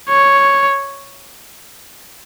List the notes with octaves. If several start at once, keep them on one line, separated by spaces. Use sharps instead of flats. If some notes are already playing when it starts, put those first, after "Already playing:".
C#5